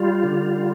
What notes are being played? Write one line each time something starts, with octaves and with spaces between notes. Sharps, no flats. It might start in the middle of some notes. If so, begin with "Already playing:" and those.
Already playing: G3 F4
D3